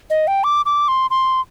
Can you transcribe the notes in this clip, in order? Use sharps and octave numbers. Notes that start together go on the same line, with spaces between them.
D#5
G5
D6
D6
C6
C6